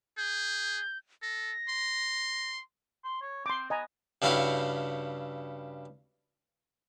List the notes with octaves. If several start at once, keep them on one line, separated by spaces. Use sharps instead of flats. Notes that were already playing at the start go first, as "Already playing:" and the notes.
G#4 G6
A4 A#6
C6
C6
C#5
C4 C6 D6
B3 D#5 G#5 A#5
G2 C#3 E4 F#4 G4 F5